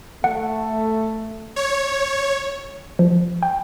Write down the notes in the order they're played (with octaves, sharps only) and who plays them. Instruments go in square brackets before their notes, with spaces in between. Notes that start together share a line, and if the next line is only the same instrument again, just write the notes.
[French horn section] A3 [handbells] F#5
[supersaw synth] C#5
[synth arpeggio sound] F3
G5